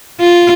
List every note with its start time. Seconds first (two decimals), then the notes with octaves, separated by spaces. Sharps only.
0.20 F4